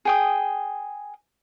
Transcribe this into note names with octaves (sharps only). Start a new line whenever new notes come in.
G#4 G5 D#6